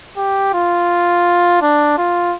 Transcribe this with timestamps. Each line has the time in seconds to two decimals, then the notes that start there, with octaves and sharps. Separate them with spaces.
0.17 G4
0.54 F4
1.62 D4
1.98 F4